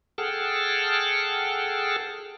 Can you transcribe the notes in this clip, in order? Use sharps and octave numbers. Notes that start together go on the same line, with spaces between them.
G#4 A4 F#5 G5 A5 F6